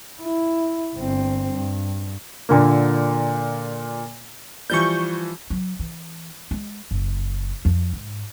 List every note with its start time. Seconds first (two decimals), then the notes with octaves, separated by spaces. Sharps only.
0.19 E4
0.96 G1 C4
1.51 G2
2.49 A#2 D3 A#3
4.70 E3 F3 G3 C#6 G6
5.50 F#3
5.79 E3
6.51 G#3
6.91 F#1
7.65 F2
7.93 G#2